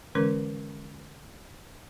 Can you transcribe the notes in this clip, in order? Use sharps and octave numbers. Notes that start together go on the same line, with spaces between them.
D3 E3 G#3 C#4 A#4